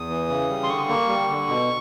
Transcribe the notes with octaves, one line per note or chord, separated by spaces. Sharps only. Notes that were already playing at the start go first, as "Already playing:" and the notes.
Already playing: E2 D#6
E3
C#3
G3
C6
D3 C#6
A#3
G3
D3
B2